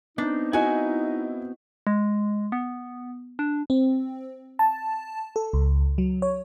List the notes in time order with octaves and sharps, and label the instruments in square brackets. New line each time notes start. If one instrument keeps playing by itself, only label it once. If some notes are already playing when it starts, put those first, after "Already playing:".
[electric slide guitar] B3 C4 [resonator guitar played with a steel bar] D4 [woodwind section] D#4
[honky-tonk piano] E4 D#5 [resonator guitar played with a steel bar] F#4 G#5
[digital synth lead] G#3
B3
D4
[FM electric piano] C4
A5
A4
C#2
F#3
C#5